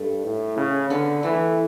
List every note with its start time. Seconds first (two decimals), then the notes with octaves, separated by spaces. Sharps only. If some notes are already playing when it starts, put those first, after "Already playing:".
Already playing: G2 A3
0.24 A2
0.57 C#3
0.90 D3 B3
1.23 E3 A3